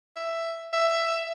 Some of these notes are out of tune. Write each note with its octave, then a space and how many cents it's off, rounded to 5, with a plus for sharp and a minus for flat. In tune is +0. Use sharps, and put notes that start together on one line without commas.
E5 +10
E5 +10